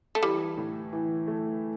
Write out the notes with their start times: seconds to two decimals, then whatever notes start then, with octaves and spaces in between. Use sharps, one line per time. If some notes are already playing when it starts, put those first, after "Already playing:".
0.15 A3
0.23 E3 G3
0.57 A2
0.93 E3
1.27 A3